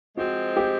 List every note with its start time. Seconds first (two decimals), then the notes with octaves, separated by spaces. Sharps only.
0.17 F3 G#3 C4 F#4
0.57 G4